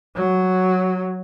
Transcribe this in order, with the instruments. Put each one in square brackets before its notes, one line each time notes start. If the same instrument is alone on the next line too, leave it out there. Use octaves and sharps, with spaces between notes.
[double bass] F#3